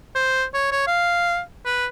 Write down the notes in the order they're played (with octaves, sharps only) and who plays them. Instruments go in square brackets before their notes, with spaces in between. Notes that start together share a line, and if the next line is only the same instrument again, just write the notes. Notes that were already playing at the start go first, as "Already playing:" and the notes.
[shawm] C5
C#5
C#5
F5
B4